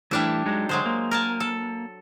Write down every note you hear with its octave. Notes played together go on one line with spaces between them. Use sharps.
E3 G3 A3 D4 E4 E5
F#3 G#3 D#4
D3 F#3 G#3 C5
A#3
A#4 G#5 A5
A4